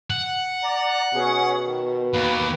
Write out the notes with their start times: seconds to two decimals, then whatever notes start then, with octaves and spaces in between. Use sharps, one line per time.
0.10 F#5
0.63 D5 A#5
1.15 B2 C#4 G#4
1.65 D#3
2.13 D#2 A#3 B4